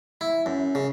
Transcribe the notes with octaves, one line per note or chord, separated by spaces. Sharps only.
E4
F#2
C#3